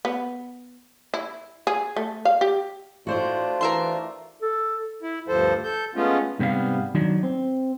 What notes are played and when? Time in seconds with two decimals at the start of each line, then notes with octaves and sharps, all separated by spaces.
0.05 B3
1.14 E4
1.67 G#4
1.96 A3
2.25 F5
2.41 G4
3.07 A2 A3 D4 F4 F#4 C5 D5
3.61 E3 A#4 E5 C6
4.42 A4
5.03 E4
5.28 D2 G2 F3 A4 C5
5.64 A4 G6
5.95 G#3 A3 B3 C#4 F4
6.39 G#2 C3 G3 B3 F5
6.95 D#3 F#3 D4 D#4
7.23 C4